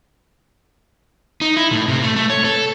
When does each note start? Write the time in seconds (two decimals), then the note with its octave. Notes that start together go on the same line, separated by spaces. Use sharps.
1.41 D#4
1.57 E4
1.72 A2
1.88 C3
2.02 A3
2.16 A3
2.30 C#5
2.45 A4